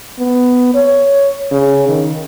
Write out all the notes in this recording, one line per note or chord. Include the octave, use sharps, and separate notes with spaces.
B3
C#5
C#3
D#3